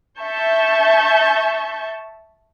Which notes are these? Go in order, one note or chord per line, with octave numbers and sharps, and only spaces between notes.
E5 A5 C#6 G6